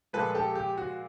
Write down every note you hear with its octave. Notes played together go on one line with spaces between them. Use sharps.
A#2 F3 G#3 A4 B4
G4 A4
G4
F#4